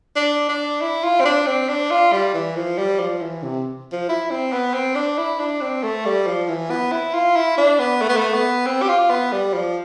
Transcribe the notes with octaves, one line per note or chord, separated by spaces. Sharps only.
D4
D4
E4
F4
C4
D4
C4
D4
F4
G3
E3
F3
G3
F3
E3
C3
F3
E4
C4
B3
C4
D4
E4
D4
C4
A3
G3
F3
E3
B3
E4
F4
E4
D4
B3
A3
B3
A3
B3
C4
G4
F4
B3
G3
F3